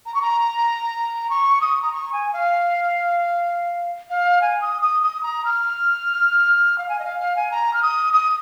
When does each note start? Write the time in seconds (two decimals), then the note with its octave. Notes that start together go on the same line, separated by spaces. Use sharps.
0.06 A#5
0.14 C#6
0.22 A#5
1.30 C#6
1.61 D#6
1.82 A#5
1.92 C#6
2.12 G#5
2.33 F5
4.10 F5
4.41 G#5
4.61 D#6
4.82 D#6
5.03 D#6
5.23 A#5
5.45 F6
6.78 F5
6.89 G#5
6.99 D#5
7.04 F5
7.20 F5
7.36 G#5
7.51 A#5
7.73 F6
7.82 D#6
8.13 D#6